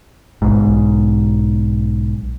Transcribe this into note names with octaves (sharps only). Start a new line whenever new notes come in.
B1 G#2